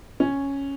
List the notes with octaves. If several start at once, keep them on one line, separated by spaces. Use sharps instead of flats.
C#4